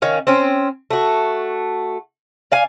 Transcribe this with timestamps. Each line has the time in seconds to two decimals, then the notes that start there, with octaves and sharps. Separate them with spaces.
0.02 D#3 C#4 F5
0.27 C4 C#4
0.91 A3 F#4
2.52 D5 F5 G#5